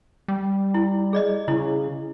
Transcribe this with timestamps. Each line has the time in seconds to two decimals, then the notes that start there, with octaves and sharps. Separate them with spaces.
0.28 G3
0.74 E4
1.13 G#4 D5 D#5
1.48 C#3 E4